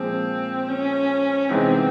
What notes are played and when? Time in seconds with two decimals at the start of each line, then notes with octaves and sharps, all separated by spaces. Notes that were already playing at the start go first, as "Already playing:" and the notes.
Already playing: A#2 F3 G#3 C4
0.69 C#4
1.50 C3 E3 G#3 B3 C4 D#4